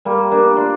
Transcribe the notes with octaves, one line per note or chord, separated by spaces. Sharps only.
G3 A#3
A#3 D4
D4 F4